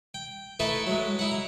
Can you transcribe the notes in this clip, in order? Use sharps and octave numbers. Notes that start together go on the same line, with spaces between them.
G5
A3 D#4 E4 A4 B4 E5
F#3 G#3
D#4 E4 F#5
A#5